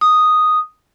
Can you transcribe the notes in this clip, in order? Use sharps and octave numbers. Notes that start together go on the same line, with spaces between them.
D#6